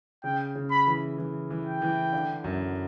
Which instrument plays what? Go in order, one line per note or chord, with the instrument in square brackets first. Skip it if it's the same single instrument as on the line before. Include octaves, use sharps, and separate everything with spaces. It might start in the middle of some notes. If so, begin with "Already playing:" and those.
[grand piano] C#3 [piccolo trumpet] G5
[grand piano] C#3
[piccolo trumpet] B5
[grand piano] E3
E3
E3
[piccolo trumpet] G5
[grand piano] E3
D3
F#2